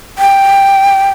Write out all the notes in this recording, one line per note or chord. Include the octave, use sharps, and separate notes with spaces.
G5